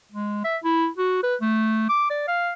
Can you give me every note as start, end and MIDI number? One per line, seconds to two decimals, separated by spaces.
0.12 0.44 56
0.44 0.57 76
0.64 0.88 64
0.98 1.19 66
1.23 1.35 71
1.41 1.87 57
1.89 2.06 86
2.10 2.25 74
2.28 2.53 77